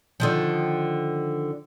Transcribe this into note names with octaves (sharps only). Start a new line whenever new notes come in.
D3 D#3 F3